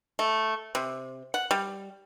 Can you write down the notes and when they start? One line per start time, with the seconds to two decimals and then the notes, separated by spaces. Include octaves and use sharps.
0.19 A3
0.75 C3
1.34 F#5
1.51 G3